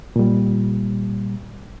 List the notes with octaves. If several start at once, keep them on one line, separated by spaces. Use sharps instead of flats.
A#2 G3